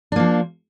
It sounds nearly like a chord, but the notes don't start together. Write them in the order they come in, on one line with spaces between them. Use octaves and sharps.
D4 A#3 F3